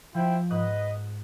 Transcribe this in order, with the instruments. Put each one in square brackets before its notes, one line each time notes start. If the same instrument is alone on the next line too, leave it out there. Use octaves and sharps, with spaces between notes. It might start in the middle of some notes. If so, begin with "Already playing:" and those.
[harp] F3 [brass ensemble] E4 C5 G5
[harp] G#2 D#6 F#6 [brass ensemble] B4 D#5